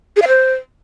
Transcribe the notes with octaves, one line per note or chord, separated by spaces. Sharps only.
G#4
F5
C5